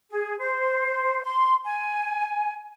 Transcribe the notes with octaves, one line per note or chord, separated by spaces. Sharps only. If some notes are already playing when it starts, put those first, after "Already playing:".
G#4
C5
C6
G#5